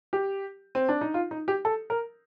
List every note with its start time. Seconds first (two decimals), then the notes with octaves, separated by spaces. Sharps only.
0.13 G4
0.75 C4
0.89 D4
1.01 D#4
1.14 F4
1.31 D#4
1.48 G4
1.65 A4
1.90 A#4